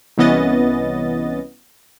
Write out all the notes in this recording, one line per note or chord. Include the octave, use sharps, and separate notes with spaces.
C2 E3 B3 C#4 D#5 A6